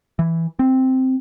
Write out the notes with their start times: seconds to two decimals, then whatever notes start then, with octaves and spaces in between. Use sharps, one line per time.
0.19 E3
0.59 C4